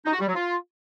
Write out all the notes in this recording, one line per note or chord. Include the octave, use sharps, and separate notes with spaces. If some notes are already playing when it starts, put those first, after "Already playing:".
D#4
F#4
G3
F#3
F4